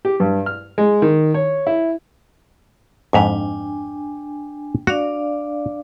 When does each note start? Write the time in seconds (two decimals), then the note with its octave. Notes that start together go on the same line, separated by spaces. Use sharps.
0.05 G4
0.20 G2
0.46 F6
0.78 G#3
1.02 D#3
1.34 C#5
1.67 E4
3.13 F2 G#2 D4 E5 G5 G#5
4.87 D4 F#4 D5 F5 F#5